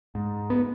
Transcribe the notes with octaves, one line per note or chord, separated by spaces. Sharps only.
G#2
B3